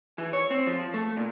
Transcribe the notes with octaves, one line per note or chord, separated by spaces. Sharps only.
E3
C#5
C4
F3
A3
A#2